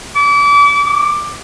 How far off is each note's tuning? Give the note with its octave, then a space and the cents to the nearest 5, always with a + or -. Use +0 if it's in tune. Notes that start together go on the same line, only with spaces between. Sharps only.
D6 -35
D6 +15